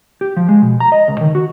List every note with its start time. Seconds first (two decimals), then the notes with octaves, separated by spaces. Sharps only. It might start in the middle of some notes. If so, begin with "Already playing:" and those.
0.21 G4
0.37 F3
0.49 G#3
0.62 B2
0.80 A#5
0.92 D#5
1.08 C#2
1.21 D#3
1.35 F#4